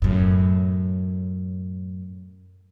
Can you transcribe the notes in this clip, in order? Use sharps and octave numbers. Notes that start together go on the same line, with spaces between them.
F#2 A2